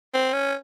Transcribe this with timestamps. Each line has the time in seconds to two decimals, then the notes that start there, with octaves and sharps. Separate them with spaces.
0.14 C4
0.33 C#4